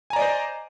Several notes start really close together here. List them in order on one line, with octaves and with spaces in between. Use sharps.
G#5 A#5 D5 D#5 C5